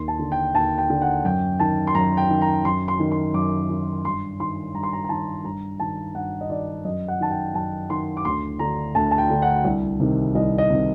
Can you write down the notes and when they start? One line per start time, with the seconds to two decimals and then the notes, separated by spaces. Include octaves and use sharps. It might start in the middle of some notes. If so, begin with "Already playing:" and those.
Already playing: D#2 C6
0.08 A5
0.19 D3
0.32 G5
0.54 D#2 A5
0.78 G5
0.90 D3
1.02 F#5
1.25 F#2 G5
1.60 D#3 A5
1.87 C6
1.95 F#2 A#5
2.17 G5
2.30 D#3
2.42 A#5
2.65 F#2 C6
2.88 C6
2.99 D#3
3.12 C6
3.34 F#2 D6
3.70 D#3
4.05 G2 C6
4.40 D#3 C6
4.74 G2 A#5
4.83 C6
4.93 A#5
5.04 A#5
5.09 D#3 A5
5.45 G2 A#5
5.80 D#3 A5
6.15 G2 F#5
6.41 D#5
6.50 D#3 D5
6.85 F#2 D#5
7.08 F#5
7.20 D#3 A5
7.31 G5
7.54 F#2 A5
7.90 D#3 C6
8.17 D6
8.25 D2 C6
8.59 D3 A#5
8.95 D2 A5
9.11 A5
9.18 G5
9.30 D3
9.42 F#5
9.64 C2
10.00 C3 D#3
10.35 C2 D#5
10.58 D#5
10.70 C3 D#3